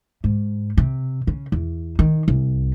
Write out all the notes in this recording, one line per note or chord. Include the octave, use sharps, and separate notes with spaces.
G#2
C3
C#3
E2
D#3
C2